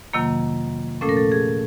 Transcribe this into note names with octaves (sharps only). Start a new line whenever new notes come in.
F2 C3 D#3 F#3 A#3
A#2 F3 A3 C#4 A4
A#4
A4
G#4